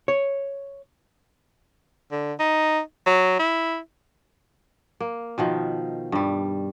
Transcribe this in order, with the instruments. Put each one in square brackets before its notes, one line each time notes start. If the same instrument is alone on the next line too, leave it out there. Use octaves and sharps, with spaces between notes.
[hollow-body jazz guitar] C#5
[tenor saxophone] D3
D#4
F#3
E4
[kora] A#3
B2 D#3 F3
G2 G3